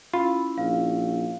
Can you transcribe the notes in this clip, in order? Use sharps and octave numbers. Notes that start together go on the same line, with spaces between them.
C#4 E4 F4 B5
A#1 F5